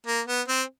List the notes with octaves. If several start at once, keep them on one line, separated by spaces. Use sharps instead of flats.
A#3
B3
C4